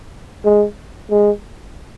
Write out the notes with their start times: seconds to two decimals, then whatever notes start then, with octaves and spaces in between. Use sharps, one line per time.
0.45 G#3
1.11 G#3